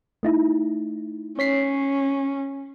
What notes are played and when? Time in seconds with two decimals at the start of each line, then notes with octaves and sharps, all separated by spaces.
0.23 A3 D#4 E4
1.39 C#4 C#5 B6 C7